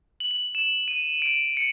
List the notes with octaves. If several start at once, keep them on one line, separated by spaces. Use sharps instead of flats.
F#7
F#7
E7
D#7
D7
C#7